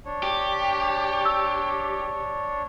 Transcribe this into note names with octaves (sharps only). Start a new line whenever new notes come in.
D4 C#5
G4
E6